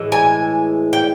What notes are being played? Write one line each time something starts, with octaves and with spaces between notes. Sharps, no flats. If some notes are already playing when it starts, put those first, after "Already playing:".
Already playing: A2 E3 G#3
G#5
G5